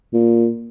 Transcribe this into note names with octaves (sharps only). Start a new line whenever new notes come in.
A#2